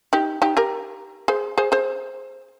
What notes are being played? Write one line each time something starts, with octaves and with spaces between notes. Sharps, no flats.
D#4 G4
D#4 G4
G4 A#4
G#4 C5
G#4 C5
G#4 C5